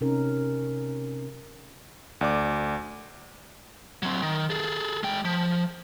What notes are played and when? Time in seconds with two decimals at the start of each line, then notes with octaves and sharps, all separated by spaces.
0.01 C3 C#4 D#4 A#4
2.21 D2 D5 D6
4.03 F#3 C4
4.22 D#3
4.50 G#4 A4
5.03 G#3 G5
5.25 F3